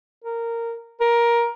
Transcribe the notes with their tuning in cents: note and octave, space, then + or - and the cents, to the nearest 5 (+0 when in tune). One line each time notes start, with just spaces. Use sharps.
A#4 -10
A#4 +15